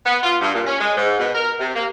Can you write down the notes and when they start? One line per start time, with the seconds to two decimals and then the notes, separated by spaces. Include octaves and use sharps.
0.05 B3
0.23 F4
0.41 G2
0.54 A#2
0.67 C#4
0.80 G#3
0.97 G#2
1.18 B2
1.35 A#4
1.59 C3
1.75 A#3